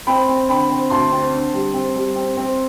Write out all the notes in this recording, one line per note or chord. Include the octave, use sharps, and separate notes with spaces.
C4 G5 B5
C4
D3 G5 B5
C4
D2 A5 C6
C4
D3
G3
C4
G3
C4
C4